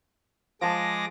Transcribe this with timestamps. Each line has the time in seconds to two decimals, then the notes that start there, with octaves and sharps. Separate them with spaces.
0.61 F3 G#3 A5 D6 A#6